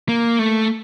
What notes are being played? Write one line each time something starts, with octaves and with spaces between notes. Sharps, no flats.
A#3
A3